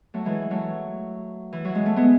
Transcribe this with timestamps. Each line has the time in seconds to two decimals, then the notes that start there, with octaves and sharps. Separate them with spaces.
0.14 F#3 A3
0.25 E3 G#3
0.51 F#3 A3
1.53 E3
1.65 F#3
1.75 G#3
1.86 A3
1.96 G#3 B3